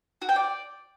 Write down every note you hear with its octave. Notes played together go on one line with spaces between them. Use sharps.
F#4
G5
D5